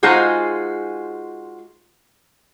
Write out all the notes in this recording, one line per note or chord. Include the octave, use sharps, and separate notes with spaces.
G#3 D#4 F4 F#4 G#4 C5